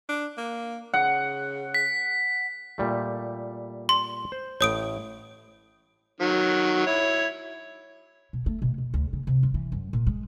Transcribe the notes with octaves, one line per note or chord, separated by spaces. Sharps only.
D4
A#3
C#3 F#5
B6
A#2 G3 A3
C6
C5
A1 A2 C#5 D#6 D7
D#3 F#3
E4 C#5
B2
A3
B2
B2
D2
C#3
C3
F3
E3
F#2
A#2
G#3